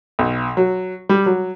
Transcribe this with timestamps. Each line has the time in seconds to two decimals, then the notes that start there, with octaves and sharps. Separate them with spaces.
0.19 B1
0.57 F#3
1.09 G3
1.26 F#3